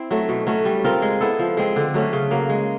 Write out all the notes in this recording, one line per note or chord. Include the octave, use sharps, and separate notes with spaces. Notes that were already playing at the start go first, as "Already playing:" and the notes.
Already playing: C4 E4
F#3 A3
B2
F#3 A3 C#4
G3
C4 F4 A#4
G#3
B3 E4 A4
F3
G#3 C4
D3
F#3 A3 C#4
C#3
F#3 A#3
G#3